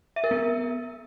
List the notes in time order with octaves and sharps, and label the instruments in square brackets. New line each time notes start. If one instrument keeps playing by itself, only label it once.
[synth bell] E5
A#4
B3